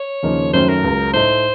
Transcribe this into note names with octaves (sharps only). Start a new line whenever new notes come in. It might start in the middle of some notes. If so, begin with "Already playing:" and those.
Already playing: C#5
D#2 C#3 F3 A#3 D#4
F#2 D#3 F#3 A3 C#4 C5
A#4
C#2 C#3 F#3
A2 A3 D#4 C5